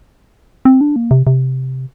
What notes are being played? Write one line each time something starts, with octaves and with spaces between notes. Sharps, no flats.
C4
D4
A#3
C3
C3